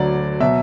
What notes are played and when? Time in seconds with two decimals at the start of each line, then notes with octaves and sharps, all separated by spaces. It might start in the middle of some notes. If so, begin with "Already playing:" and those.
Already playing: D2 D3 F#3 D5
0.40 B2 F#3 E5